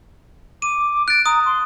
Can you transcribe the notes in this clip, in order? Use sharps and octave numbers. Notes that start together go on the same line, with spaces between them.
D6 D#7
F#6 A6 D7
A#5 D#6
C6